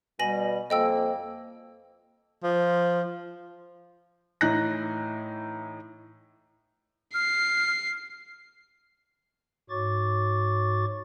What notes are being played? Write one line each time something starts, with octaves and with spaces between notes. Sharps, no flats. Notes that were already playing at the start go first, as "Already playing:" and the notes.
B2 G3 G#5 A#6 F#7
F2 A#3 D#5 G5 E6
F3
A2 E3 D#4 F#6 A#6
F6 C7
G#2 F#4 C#5 C#6 D6 A6